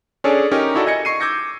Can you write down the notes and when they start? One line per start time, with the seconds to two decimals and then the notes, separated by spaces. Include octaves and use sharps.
0.24 C#4 D4 G#4 A4 C#5 D5
0.51 C#4 D#4 G4 A#4
0.75 D#4 E4 F#4 A4 D5
0.86 D#5 G#5 G#6 A#6 C#7
1.05 C#6 C7 D#7
1.20 D6 E6 G6 G#6 A#6 C#7